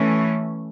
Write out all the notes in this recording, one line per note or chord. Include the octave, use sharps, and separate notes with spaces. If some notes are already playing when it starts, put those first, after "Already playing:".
Already playing: E3 A3 C#4